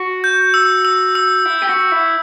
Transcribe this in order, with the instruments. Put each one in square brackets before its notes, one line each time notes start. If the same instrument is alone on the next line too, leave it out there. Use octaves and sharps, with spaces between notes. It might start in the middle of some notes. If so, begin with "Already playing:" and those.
Already playing: [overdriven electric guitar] F#4
[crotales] G6
E6
E6
E6
[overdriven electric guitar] E4
G4
F#4
E4